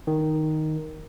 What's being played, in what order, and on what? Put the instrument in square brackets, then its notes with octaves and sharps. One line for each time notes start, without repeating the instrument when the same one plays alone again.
[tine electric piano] D#3